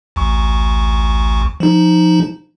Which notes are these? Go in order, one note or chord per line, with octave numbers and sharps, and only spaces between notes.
A1 D2 C#6
F3 D#4